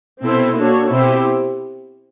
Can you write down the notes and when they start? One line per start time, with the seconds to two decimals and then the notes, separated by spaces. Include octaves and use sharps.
0.21 B2 C4 E4 A4 C5
0.56 A#3 D4 F#4 A4 C#5
0.89 B2 C4 E4 G4 C5